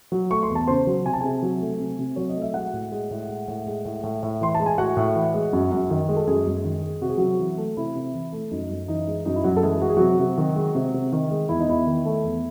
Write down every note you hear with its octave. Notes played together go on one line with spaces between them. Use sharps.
F#3
A3 C#6
C6
E2
A5
C#3 C5 C6
F#3
C3 G#5
A5
C3 G#4 G#5
F#3
A3
C3
C3
F#3 C#5
D#5
A3
E5
G#3 F#4 F#5
A2
G#3
A2
G#3
A2
G#3
A2
A2
A2
E3 C6
A5
G#3
G#5
A2 F#4 F#5
A2
E3
G#3
F#2
F#2
D#3
G#3
A4
F#2 G#3 G#4
F#2
D#3
G#3
C3 F#4
G#4
C3 F#3 F#4
E3
A3
C3 E4
C3
E3
A3
F#2 D#4
F#2
E3 D#4
G#3
F#2 D#4
E4
F#2 F#3 F#4
A4
E3 G#3 G#4
G#3 F#4
G#4
C3 F#3 F#4
C3
D#3
G#3
C3
C3
D#3
G#3
E2 E4
D#4
E2 E4
D#3
A3
E2